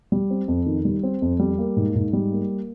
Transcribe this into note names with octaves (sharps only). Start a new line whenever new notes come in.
G3
C4
F2
D#3
G3
C4
F2
G3
A#3
G#2
G#2
G3
A#3